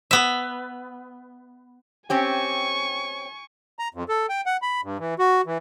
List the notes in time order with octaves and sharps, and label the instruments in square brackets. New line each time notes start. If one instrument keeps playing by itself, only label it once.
[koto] B3 E5
[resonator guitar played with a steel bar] C4 C#4 G4 [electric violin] G#5 C#6
[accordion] A#5
F2
A4
G5
F#5
B5
G2
E3
F#4
E3